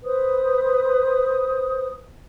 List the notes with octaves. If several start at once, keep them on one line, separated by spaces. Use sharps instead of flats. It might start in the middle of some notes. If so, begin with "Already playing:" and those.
B4 C5 D#6